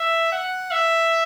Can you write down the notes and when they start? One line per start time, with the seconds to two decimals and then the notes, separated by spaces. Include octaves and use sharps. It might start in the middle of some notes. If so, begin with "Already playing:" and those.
Already playing: E5
0.32 F#5
0.71 E5